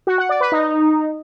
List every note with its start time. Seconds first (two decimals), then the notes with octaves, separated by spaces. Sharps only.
0.07 F#4
0.18 F#5
0.29 D5
0.41 B4
0.52 D#4